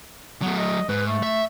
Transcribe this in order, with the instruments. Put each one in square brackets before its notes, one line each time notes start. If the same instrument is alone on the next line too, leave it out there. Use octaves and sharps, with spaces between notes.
[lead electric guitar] F#3 A3 [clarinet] B3
[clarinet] D#5
[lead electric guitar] G#2 [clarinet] B4
[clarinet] A3
[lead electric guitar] E5